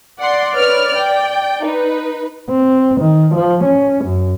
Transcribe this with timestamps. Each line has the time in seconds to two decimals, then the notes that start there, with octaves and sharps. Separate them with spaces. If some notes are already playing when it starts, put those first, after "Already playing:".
0.19 D5 F#5 C6
0.55 B4 C#5 F6
0.96 G5
1.64 D#4 B4
2.50 C4
3.01 D#3
3.35 F3
3.64 C#4
4.05 F#2